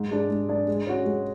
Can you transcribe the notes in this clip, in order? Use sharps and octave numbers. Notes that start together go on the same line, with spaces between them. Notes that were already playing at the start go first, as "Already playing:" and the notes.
Already playing: G#2
G#3 D4 G#4 D5
G#2
G#3 D4 G#4 D5
G#3
C#4 F#4
G#3